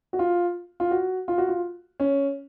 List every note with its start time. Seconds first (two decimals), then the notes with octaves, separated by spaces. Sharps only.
0.13 F#4
0.19 F4
0.80 F4
0.91 F#4
1.28 F4
1.38 F#4
1.48 F4
2.00 C#4